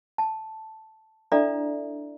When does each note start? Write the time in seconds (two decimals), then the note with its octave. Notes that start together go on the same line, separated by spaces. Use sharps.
0.18 A5
1.32 D4 E4 A4 D5 E5 A#5